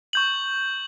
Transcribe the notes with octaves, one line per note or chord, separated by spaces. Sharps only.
C#6 G6 F#7